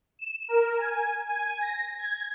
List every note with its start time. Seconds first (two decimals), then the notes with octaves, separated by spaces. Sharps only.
0.19 E7
0.48 A#4
0.78 G#5
1.28 G#5
1.61 A#6
1.99 G#6